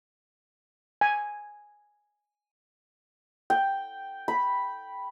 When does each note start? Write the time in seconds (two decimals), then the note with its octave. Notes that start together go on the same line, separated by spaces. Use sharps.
1.01 G#5
3.50 G5
4.28 B5